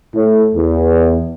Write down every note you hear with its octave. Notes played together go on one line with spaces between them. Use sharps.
A2
E2